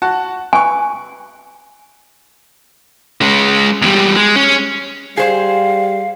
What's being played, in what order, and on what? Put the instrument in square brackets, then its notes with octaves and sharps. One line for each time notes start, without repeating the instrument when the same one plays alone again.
[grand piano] F#4 F#5 A5
[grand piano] B4 C#6 [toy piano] G#5
[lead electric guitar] G#3 C#4
E2 G3
G#3
C#4
[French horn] G3 [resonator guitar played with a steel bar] G#4 C5 [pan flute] F5